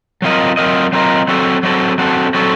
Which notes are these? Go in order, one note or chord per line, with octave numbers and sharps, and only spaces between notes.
F#3 C4 F4 A#4 D#5
F#3 C4 F4 A#4 D#5
F#3 C4 F4 A#4 D#5
F#3 C4 F#4 A4
F#3 C4 F#4 A4
F#3 C4 F#4 A4
F#3 C4 F#4 A4